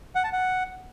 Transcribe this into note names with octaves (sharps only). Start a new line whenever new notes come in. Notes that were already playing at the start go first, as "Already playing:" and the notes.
F#5
A5
F#5